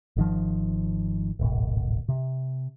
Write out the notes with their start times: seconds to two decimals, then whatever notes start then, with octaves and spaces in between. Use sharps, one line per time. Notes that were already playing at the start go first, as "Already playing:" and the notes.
0.16 G#1 D#3 F3
1.39 D1 G#1 B2
2.09 C3